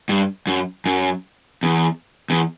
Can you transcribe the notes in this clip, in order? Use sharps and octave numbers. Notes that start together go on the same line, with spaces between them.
G2
F#2
F#2
E2
E2